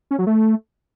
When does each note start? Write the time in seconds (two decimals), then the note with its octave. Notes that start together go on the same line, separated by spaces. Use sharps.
0.11 C#4
0.19 F#3
0.27 A3